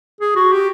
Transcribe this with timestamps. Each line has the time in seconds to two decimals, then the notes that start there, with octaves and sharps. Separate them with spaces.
0.21 G#4
0.36 F#4
0.53 G4